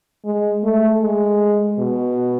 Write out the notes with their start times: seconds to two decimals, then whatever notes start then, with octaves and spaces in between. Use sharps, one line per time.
0.25 G#3
0.64 A3
1.02 G#3
1.79 B2